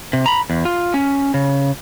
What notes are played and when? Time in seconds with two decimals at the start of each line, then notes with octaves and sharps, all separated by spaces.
0.13 C3
0.26 A#5 B5
0.50 E2
0.65 F4
0.94 C#4
1.34 C#3